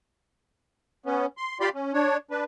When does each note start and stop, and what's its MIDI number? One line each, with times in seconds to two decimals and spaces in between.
1.06 1.26 59
1.06 1.26 61
1.37 1.58 84
1.60 1.69 65
1.60 1.69 67
1.60 1.69 74
1.60 1.69 83
1.60 1.69 84
1.75 1.92 61
1.93 2.17 62
1.93 2.17 73
2.31 2.44 62
2.31 2.44 71